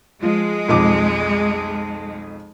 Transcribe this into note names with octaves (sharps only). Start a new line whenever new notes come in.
F3 G#3
B1 F2 D6